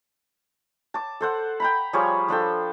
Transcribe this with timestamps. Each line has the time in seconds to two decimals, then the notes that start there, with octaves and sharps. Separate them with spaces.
0.94 A5 D6
1.21 A4 C5 F#5
1.60 G5 A#5 B5
1.93 F3 G3 G#4 C#5
2.29 F3 D4 A4 G5